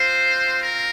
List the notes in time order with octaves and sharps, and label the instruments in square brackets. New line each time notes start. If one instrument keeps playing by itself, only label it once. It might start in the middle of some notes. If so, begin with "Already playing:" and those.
Already playing: [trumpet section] C4 F4 C5
A#4